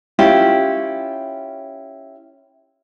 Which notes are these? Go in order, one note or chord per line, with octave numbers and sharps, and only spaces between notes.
C#4 E4 F4 G4